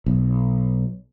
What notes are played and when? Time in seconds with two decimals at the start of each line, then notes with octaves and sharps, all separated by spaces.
0.06 B1